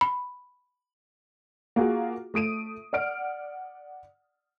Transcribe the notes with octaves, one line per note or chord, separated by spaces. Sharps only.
B5
A#3 F4 F#4 G#4
A3 D#6 D7 D#7
D5 F#5 F6 D7